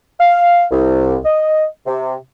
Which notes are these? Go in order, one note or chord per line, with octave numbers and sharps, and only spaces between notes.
F5
C2
D#5
C3